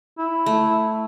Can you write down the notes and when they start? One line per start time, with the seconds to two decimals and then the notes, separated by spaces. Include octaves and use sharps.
0.18 E4
0.46 A3